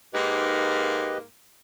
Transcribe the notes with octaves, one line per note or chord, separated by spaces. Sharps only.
G#2 A#3 G4 B4 D#5